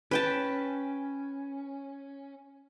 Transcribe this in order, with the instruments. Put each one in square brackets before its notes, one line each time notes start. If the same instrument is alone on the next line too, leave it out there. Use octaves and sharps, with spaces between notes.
[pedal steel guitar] C#4 [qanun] B4 G5 A5